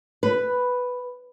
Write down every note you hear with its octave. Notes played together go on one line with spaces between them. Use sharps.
B4